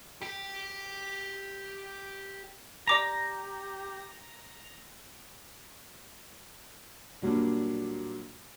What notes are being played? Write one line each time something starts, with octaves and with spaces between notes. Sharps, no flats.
G4 G5
G4 D5 A#5 D6 F7
A#2 F#3 G3 A#3 D4